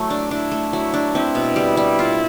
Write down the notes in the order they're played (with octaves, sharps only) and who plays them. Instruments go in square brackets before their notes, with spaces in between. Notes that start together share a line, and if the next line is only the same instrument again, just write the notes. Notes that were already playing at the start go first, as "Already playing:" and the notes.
Already playing: [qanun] F#3 A3 [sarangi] E4
[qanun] D4
[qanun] D4 [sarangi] E4
[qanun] A3
[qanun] F#3 [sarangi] E4
[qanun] D4
[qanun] C4 [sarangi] E4
[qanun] B2
G3
G3
F4